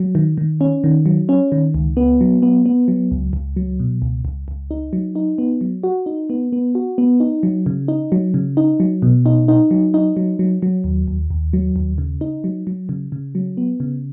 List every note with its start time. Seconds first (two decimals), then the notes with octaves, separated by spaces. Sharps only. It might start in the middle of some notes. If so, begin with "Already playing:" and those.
Already playing: F#3
0.15 D#3
0.38 D#3
0.61 C#4
0.84 D#3
1.06 F#3
1.29 C#4
1.52 D#3
1.74 C#2
1.97 B3
2.21 F#3
2.42 B3
2.66 B3
2.88 F#3
3.11 C#2
3.33 C#2
3.56 F#3
3.80 B2
4.02 C#2
4.25 C#2
4.48 C#2
4.71 D#4
4.93 F#3
5.15 D#4
5.38 B3
5.61 F#3
5.83 F#4
6.06 D#4
6.30 B3
6.52 B3
6.75 F#4
6.98 B3
7.20 D#4
7.43 F#3
7.66 C#3
7.88 D#4
8.12 F#3
8.34 C#3
8.57 D#4
8.80 F#3
9.02 B2
9.26 D#4
9.48 D#4
9.71 F#3
9.94 D#4
10.17 F#3
10.39 F#3
10.62 F#3
10.84 D#2
11.08 D#2
11.30 D#2
11.53 F#3
11.76 D#2
11.98 C#3
12.21 D#4
12.44 F#3
12.67 F#3
12.89 C#3
13.12 C#3
13.35 F#3
13.57 B3
13.80 C#3